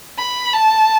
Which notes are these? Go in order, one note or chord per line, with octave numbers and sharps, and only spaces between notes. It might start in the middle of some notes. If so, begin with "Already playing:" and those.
B5
A5